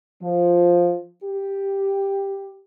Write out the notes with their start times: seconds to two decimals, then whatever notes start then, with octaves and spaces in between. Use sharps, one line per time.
0.23 F3
1.23 G4